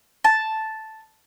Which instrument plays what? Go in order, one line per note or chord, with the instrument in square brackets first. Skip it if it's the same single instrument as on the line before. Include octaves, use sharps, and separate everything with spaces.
[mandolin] A5